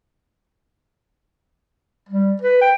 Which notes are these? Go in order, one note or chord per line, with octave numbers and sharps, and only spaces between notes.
G3
B4
G5